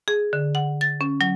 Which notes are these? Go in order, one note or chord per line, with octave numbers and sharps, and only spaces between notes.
G#4
D3
F#5
A6
C#4
F#3